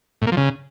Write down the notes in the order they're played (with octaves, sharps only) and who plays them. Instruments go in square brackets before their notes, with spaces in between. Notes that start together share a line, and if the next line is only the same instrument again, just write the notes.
[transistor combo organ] A2
A#3
F3
C#3